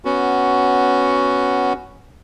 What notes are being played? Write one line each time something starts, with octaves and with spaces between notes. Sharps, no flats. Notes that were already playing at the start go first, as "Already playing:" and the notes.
B3 C#4 F#4